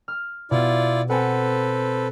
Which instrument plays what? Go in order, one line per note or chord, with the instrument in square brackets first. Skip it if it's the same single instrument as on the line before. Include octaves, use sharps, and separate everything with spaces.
[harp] F6
[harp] B2 [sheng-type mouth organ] E4 F4 D5
[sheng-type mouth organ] C4 A4 B4 [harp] F#5 G#5